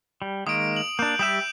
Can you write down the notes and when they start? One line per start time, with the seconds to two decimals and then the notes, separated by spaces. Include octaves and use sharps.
0.22 G3
0.47 D#3 G#3 A#3 D#6 D7
0.76 F#7
0.99 A#3 D4 G6
1.19 G3 G4 E5 D#6 G6 E7